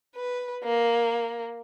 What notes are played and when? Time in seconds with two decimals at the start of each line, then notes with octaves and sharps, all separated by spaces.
0.16 B4
0.64 A#3